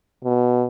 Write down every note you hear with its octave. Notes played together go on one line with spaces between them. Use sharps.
B2